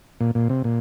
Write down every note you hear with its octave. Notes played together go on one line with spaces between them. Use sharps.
A#2
A#2
C3
A#2